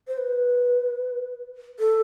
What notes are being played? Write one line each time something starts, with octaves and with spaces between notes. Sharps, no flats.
C5
B4
A4